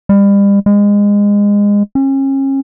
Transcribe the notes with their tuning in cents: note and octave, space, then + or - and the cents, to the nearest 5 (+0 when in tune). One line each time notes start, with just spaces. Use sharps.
G3 +35
G#3 -25
C#4 -35